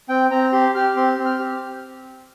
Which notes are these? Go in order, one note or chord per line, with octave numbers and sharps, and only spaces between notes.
C4 G5
C4 A#5
G4 C6
G4 F6
C4 C6
C4
F6
G4